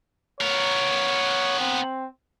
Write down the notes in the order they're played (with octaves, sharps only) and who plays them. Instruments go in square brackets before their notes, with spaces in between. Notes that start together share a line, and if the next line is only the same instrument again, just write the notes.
[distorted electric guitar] B3 A#4 [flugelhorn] C#5
[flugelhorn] C4